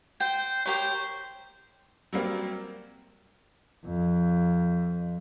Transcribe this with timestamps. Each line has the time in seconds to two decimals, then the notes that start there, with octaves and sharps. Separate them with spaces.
0.20 C5 G5
0.66 G4 A#4 C5 C#5
2.13 F#3 G3 A#3 C4
3.86 F2